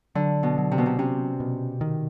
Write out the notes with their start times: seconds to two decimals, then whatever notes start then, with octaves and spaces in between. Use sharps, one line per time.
0.15 D3 F#3
0.43 B2
0.58 F#3
0.71 C3
0.78 B2
0.86 C3
0.98 C3 C#4
1.40 B2
1.81 D#3